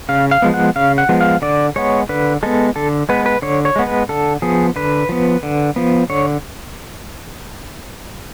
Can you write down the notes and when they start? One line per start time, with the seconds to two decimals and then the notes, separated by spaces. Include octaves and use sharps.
0.09 C#3 F5
0.31 F5
0.42 F3 G#3 B3
0.54 F#5
0.76 C#3 F5
0.98 F#5
1.09 F3 G#3 B3
1.21 F5
1.42 D3 D5
1.76 G#3 B3 C#5
2.09 D3 B4
2.43 G#3 B3 A4
2.76 D3 A4
3.09 G#3 B3 B4
3.26 B4
3.42 D3 C#5
3.65 C#5
3.76 G#3 B3
3.87 B4
4.09 D3 A4
4.42 F3 B3 G#4
4.76 D3 B4
5.09 F3 B3
5.43 D3
5.76 F3 B3
6.10 D3 C#5